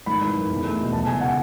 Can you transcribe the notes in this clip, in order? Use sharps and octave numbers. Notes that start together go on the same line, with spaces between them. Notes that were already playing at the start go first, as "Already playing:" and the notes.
G#1 B5
E3
F#2
E2
A3
B2
E1 A5
C#3 G#5
F#5